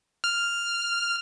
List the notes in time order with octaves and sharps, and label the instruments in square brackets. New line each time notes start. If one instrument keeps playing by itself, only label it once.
[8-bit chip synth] F6